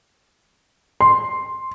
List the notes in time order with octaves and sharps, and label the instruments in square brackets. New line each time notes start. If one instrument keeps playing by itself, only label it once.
[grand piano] C6